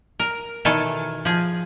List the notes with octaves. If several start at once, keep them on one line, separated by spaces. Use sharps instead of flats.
A#4
B2 D#3 E3 A4 C#5 G#5
F3 G#4